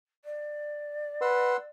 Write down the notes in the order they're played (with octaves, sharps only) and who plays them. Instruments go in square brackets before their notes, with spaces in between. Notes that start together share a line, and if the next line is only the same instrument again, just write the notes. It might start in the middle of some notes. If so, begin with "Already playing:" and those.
[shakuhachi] D5
[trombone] B4 [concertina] F#5 C6 E6